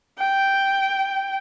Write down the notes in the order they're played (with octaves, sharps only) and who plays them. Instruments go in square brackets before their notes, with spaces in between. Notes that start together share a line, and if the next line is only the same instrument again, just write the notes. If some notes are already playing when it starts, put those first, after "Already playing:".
[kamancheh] G5